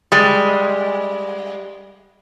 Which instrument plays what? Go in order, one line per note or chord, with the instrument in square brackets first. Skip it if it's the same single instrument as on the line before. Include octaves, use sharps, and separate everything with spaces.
[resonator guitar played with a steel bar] G3 G#3